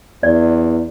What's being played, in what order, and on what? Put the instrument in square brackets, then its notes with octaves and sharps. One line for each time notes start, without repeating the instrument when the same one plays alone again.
[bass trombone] E2 [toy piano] D5